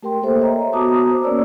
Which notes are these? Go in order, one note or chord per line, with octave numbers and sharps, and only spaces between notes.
A3 G4 A#4 G5 C6
A#3 A4 C5 E5
C#5 D#5 E5 A#5
B3 F#4 A5 A#5 D6 D#6
C5
A#3 C#4 A#4 C#5 D5 E6